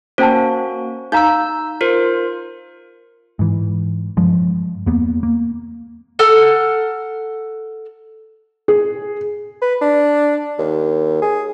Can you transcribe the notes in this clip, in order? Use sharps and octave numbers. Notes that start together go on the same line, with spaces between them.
A#3 C#4 F#4 C5 G5 A5
D#4 F5 A#5 E6 G6
F4 A#4 C5
G#2 E3
G2 F3 G#3
E2 A#3 B3
A#3
A4 F#5 A#5 F6
G#4
B4
D4
D#2
G#4